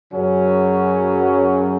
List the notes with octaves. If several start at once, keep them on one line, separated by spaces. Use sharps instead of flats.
F#2 C#3 F#3 C#4